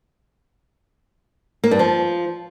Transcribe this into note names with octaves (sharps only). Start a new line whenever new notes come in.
A#3
G2
F3